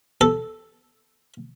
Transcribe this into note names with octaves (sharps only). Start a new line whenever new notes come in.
A4